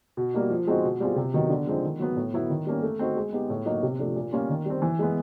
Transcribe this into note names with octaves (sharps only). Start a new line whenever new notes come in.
B2
G3 A#3 D#4
F3
G#3 C4 D#4 F#4
B2
G3 C4 F4 G#4
C3
D#3 F#3 B3 D#4
D3
F3 G#3 C4 D#4
D#3
F#3 B3
A2
F#3 B3 E4
D#3
G3 A#3 C#4
A3
C4 D#4 F#4
G#3
B3 D#4 G4
A2
F#3 A#3 D#4 F#4
C3
F3 A3 D4
A#2
G3 A#3 C#4 F4
D#3
G3 C4
E3
G#3 B3